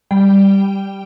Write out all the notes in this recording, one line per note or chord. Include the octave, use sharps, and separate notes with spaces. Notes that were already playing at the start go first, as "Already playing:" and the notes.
G3 G5